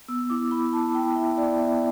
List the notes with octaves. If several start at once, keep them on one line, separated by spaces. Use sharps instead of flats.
B3 E6
E4 D6
E4 B5
E4 A5
E4 G5
E4 E5
B3 D5
B3 E5